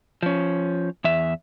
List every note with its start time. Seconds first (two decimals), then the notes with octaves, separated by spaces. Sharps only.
0.23 F3 C#4
1.04 E2 E5